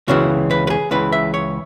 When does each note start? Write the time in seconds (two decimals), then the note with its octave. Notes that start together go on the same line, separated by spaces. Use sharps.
0.08 C#2 C#3 E3 F#4
0.51 B4
0.67 B4
0.70 G#4
0.91 C#2 C#3 E3 B4
1.12 E5
1.34 C#5